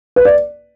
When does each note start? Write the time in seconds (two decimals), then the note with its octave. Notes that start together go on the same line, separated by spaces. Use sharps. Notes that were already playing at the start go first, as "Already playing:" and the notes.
0.16 B4
0.25 D5